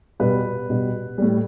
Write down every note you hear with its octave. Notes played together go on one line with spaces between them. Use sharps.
B2 G3 B4
B2 G3
A2 G3